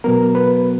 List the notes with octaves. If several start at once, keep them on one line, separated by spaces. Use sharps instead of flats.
B2 F#3 B3 A#4
B4